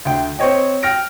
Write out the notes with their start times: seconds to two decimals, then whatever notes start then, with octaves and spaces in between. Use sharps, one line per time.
0.05 D2 G5
0.39 C4 C5 C#5 D#5 G5
0.83 G5 F6 A#6 D7